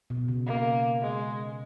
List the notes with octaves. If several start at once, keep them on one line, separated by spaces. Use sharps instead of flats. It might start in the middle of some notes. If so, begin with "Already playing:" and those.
B2
C#3
A#3
G#3